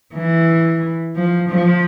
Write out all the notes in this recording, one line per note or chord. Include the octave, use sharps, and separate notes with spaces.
E3
F3
F3